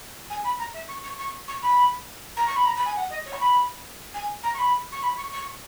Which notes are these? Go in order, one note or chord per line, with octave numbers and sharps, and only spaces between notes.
G#5
B5
A#5
E5
C#6
C#6
C#6
C#6
B5
A#5
C#6
B5
A#5
B5
G#5
F#5
D#5
C#5
C#6
B5
G#5
A#5
C#6
B5
C#6
B5
C#6
C#6